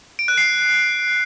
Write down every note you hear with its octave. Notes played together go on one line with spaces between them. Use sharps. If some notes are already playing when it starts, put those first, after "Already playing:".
D7
F#6
C7